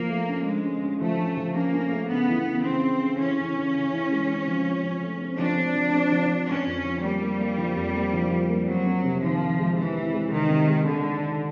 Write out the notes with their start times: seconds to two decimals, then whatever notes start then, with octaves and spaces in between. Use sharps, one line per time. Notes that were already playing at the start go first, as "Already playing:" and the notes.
Already playing: F3 A#3
0.10 A3
0.28 C#4
0.46 D3 G#3
0.64 C#4
0.83 C#4
1.01 F3 A3
1.19 C#4
1.37 F3
1.55 A#3 C#4
1.74 C#4
1.92 A3
2.11 C#3 B3
2.29 E3
2.47 C#3
2.65 C#3 C4
2.84 C#3
3.02 C#3
3.20 E3 C#4
3.38 E3
3.56 C#3
3.75 C#3
3.93 E3
4.11 G#3
4.29 C4
4.48 F3
4.66 F3
4.84 F3
5.02 A3
5.21 C4
5.39 F3 D4
5.57 C4
5.76 F3
5.94 C4
6.12 F3
6.30 C4
6.48 D3 C#4
6.67 F2
6.84 F3
7.03 G3 A#3
7.22 A#3
7.40 A#3
7.58 F3
7.76 F2
7.95 A#3
8.13 F3
8.31 F3
8.50 A#3
8.68 F#3 C4
8.86 C4
9.04 C3
9.22 D#3 F3
9.40 D#3
9.59 G#3
9.77 E3 C4
9.96 C4
10.13 G#3
10.31 C3 D#3
10.49 C3
10.68 G#3
10.86 D3 G#3
11.05 D#3
11.23 D#3